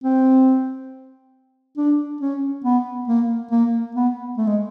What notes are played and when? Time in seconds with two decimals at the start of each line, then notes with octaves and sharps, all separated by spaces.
0.04 C4
1.78 D4
2.21 C#4
2.64 B3
3.08 A#3
3.51 A#3
3.95 B3
4.38 A3
4.47 G#3